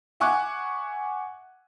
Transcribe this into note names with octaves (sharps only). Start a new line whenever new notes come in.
E5 F#5 G#5 C#6 D6 F#6